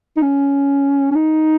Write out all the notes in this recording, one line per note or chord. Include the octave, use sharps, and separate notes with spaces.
D#4
C#4
C#4
D#4